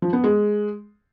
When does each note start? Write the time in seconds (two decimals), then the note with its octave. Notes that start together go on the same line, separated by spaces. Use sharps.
0.02 F3
0.13 B3
0.24 G#3